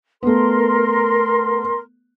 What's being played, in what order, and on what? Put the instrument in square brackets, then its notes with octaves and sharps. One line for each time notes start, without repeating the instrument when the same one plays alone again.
[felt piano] A3 B3 [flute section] A#4 C6